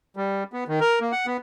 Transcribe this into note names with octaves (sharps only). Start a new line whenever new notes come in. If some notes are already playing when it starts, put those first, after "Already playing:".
G3
B3
D#3
A#4
A#3
F#5
B3